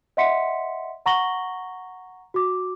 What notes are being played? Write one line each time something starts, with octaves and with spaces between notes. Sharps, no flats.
D#5 E5 F#5 C6 B6 C#7
F#5 A#5 C#6 A#6 F#7 G7
F#4 D6